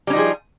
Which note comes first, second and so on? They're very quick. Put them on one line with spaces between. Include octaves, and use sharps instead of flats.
G3 C#4 D#4 F3 G#4